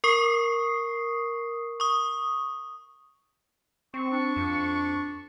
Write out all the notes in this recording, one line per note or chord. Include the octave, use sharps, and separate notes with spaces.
A#4 C#6 D#6 C7
C#6 D#6
C4 C#6
D4
F2